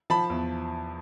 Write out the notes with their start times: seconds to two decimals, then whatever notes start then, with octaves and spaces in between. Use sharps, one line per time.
0.10 F3 A5 B5
0.30 E2